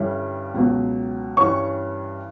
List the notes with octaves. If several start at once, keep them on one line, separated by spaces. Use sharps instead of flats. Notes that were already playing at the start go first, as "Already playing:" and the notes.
Already playing: G2 D3 G3 C#4 E4
C#2 B2 F#3
G2 E3 G3 C#4 C#6